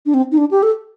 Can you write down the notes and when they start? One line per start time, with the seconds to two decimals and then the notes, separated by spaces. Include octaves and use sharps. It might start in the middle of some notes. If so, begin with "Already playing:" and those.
0.06 D4
0.14 C4
0.32 D#4
0.37 D4
0.51 G4
0.63 A4